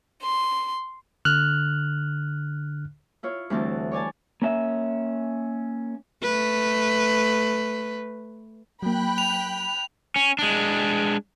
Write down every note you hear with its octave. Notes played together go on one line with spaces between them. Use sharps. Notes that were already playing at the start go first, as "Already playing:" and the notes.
C6
D3 F6 F#6
E4 F4 C#5
D2 E3 G3 A3 C4 A5
C#5 D5 G#5 A5
A#3 C#4 E5
A3 B4
F#3 A#3 G5 B5 F#6
F7
C#4
G#3 D4